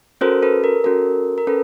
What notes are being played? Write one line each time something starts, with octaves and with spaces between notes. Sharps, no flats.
C#4 F#4 A4 A#4 C5
A4 B4
A#4
C#4 F#4 A4 A#4
A#4
C#4 A4 B4